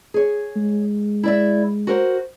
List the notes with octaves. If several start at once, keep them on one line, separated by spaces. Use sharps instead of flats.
G#4 C#5
G#3
E4 D5 E5
F#4 A#4 C5